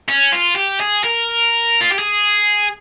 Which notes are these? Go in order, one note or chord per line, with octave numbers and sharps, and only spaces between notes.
C#4
F4
G4
G#4
A#4
F4
G4
G#4